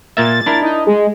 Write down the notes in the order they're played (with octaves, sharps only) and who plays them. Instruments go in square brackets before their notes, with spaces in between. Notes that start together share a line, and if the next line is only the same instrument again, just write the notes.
[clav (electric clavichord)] A#2 A#3 E5 [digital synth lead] A6
[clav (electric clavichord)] D4 E4 A#4
[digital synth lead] D#4
G#3